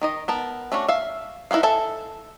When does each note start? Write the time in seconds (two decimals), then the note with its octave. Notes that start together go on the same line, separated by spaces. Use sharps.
0.01 D#3 D#4 D#5
0.28 B3 A#4 A5
0.72 A3 C#4 D4 E4 F#4
0.88 E5 F5
1.51 D#4 E4 G4 B4 F5
1.63 A4 E5 G#5 A5